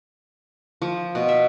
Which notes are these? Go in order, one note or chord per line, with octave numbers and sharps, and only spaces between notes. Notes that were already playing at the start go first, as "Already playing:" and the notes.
F3
B2
E5